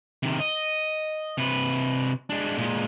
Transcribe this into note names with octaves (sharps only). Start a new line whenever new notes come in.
C3 D#3
D#5
C3 B4
G#3 D4
A#2 G#3